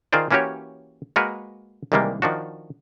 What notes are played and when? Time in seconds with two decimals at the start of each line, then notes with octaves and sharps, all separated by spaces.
0.13 D#3 F4 G#4 A#4 C5 D5
0.31 E3 A#3 C#4 F#4 G4 C#5
1.16 G#3 A#3 F#4 A#4 B4
1.92 C2 D#3 E3 G3 G#3 A#3
2.22 D#3 F3 D4 F#4